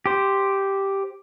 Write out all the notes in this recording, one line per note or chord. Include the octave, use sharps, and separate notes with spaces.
G4 C5